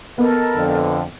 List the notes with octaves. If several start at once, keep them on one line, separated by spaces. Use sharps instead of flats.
B3 A4 A#4 D#5
F2 D3